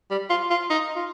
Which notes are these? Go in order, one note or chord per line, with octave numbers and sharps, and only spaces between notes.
G3
F4
F4
D#4
F4